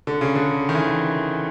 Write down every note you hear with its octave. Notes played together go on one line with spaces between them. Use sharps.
D3
C#3
D3
D#3
E3